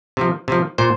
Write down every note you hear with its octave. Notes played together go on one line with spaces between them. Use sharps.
C3 F3
C3 F3
A#2 C5